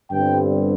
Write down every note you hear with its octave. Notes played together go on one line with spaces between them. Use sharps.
G1 G2 D3 G3 C4 G5